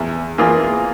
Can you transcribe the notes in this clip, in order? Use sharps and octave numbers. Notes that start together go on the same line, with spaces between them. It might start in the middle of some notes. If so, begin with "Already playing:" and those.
Already playing: E2
E3 A#3 F4 G#4